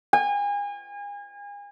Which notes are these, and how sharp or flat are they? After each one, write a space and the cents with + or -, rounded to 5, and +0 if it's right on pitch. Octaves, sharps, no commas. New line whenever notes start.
G#5 -35